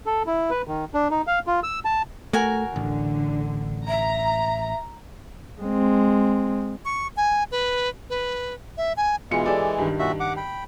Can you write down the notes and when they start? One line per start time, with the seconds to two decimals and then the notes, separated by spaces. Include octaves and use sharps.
0.06 A4
0.26 E4
0.50 B4
0.67 D#3
0.94 D4
1.11 D#4
1.27 F5
1.47 F4
1.63 E6
1.85 A5
2.33 A3 F#4 A#4 G#5
2.76 A1 D3
3.88 E5 A#5
5.62 G#3 C4
6.85 C#6
7.17 G#5
7.51 B4
8.10 B4
8.77 E5
8.97 G#5
9.31 B1 E3 G#3 F4 C#7
9.46 G4 A4 D5
9.78 G2 D#3
9.99 A#2 F#4 E5
10.20 F#5 D6
10.37 G5 B5